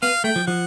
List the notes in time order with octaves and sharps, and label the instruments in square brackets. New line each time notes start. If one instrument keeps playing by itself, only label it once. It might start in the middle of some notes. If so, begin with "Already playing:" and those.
[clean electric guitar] B3 [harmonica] F5
[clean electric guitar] A3 [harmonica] G5
[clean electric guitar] F3
[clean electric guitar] F3 [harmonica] F#5